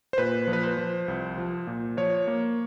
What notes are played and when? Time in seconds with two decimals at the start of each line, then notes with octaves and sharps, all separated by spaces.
0.13 C5
0.18 A#2 B4
0.48 F3
0.53 B4
0.63 C5
0.77 F3
1.08 C2
1.38 F3
1.67 A#2
1.97 F3 C#5
2.27 A#3